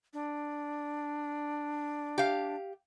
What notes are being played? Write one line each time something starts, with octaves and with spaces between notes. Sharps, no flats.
D4
G4 F5